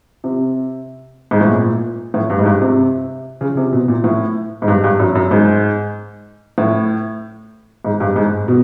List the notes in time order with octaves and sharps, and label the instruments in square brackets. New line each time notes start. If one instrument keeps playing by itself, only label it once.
[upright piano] C3
G#2
A2
A#2
A2
G2
G#2
G2
C3
C#3
C3
B2
A#2
A2
G#2
G2
G2
F#2
F#2
G#2
A2
G#2
G2
G#2
B2